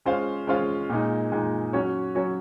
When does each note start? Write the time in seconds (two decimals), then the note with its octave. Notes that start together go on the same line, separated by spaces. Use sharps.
0.05 G#3 C#4 F4 C5 F5
0.47 G#3 C#4 F4 C5 F5
0.90 A#2 G#3 D#4
1.32 A#2 G#3 D#4
1.73 F#3 C#4 F#4 C#5
2.15 F#3 C#4 F#4 C#5